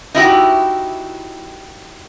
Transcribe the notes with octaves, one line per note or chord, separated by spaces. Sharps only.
D#4 E4 F#4 G4